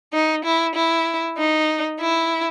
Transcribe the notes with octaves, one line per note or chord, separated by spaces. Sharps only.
D#4
E4
E4
D#4
E4